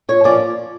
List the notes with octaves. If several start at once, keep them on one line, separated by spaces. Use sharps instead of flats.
A#2 C#5
F3 A#3 C#4 D5